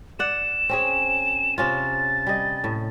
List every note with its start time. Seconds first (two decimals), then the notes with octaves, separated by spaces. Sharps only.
0.19 D5 F#5 E7
0.69 C4 C#4 G#4
1.58 C3 C#4 F4 A6
2.27 G3 D#5
2.64 A2